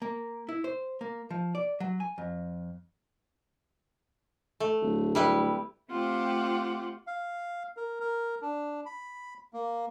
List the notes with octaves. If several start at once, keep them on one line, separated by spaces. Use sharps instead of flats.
A#3
E4
C5
A#3
F3
D5
F#3
G#5
F2
A3
D1
G3 E4 B4
A3 C4 F4 G4 F#5
F5
A#4
A#4
D4
B5
A#3